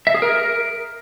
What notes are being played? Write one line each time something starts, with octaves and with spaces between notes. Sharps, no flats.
E5
G#4
A#4